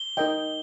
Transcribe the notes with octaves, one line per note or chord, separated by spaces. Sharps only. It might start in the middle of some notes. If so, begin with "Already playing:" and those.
Already playing: G7
D#4 A#4 D#5 G5